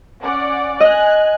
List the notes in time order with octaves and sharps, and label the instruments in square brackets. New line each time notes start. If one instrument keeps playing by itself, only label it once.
[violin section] C#4 D5 F#5
[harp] D#5 [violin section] G#5 F#6